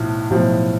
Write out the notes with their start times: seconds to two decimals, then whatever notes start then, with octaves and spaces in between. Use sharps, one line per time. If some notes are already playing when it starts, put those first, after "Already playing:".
Already playing: B1 A2 F3
0.30 B1 A2 F3